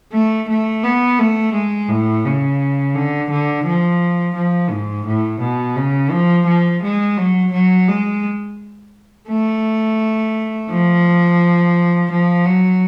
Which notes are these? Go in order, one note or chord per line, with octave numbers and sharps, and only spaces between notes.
A3
A3
B3
A3
G#3
A2
C#3
D3
D3
F3
F3
G#2
A2
B2
C#3
F3
F3
G#3
F#3
F#3
G#3
A3
F3
F3
F#3